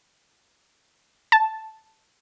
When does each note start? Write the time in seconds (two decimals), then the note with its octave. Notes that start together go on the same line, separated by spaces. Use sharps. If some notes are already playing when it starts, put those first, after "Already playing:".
1.32 A5